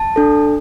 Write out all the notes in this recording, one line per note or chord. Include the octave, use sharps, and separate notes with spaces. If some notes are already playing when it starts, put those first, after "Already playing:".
Already playing: A5
D4 A4